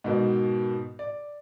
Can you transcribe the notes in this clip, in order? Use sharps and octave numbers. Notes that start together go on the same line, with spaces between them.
G#2 B2 D#3
D5